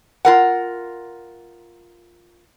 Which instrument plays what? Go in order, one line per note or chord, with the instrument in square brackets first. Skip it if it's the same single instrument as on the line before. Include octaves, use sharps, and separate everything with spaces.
[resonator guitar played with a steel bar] F4 A#4 F#5